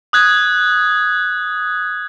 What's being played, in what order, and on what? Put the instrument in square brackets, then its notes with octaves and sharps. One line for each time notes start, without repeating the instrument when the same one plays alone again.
[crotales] D#6 F#6 G#6